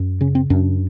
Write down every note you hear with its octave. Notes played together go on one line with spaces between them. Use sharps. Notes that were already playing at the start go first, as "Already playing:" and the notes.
Already playing: F#2
C#3 C#4
C4
F#2 D4